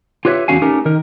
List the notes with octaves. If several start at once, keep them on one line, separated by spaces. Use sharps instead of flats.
F4 G4 B4 C#5 D#5 E5
E2 D3 C#4 F#4 F5 G#5
A3 C#4 D#4 G4 A#4
D#3 A#4